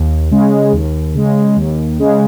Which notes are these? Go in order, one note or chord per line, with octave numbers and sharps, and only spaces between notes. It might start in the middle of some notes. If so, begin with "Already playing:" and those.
Already playing: D#2
C#3 G#3
D#2
C#3 G#3
D#2
C#3 G#3